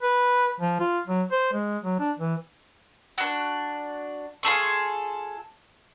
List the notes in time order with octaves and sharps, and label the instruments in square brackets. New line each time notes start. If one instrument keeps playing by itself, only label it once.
[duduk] B4
F3
F4
F#3
C5
G#3
F#3
D4
E3
[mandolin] D4 F#4
F4 G#4 A4 C#6